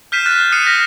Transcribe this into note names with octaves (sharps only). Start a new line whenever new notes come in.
F6 G6 B6 C7 D#7 E7
F6 F#6 A6
D#6 F#6 C7 C#7 D#7 E7
F6 A#6 B6